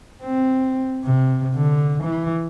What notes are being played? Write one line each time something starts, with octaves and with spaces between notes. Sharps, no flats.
C4
C3
D3
E3